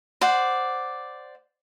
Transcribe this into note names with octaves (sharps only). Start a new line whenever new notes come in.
C5 D5 F#5